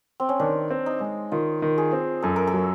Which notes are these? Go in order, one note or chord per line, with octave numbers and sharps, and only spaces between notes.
C4
C#4
D#3 D4
C4
D#4
G#3
D#3 F4
D#3
G#4
C4
F#2 A4
A#4
A4
F#3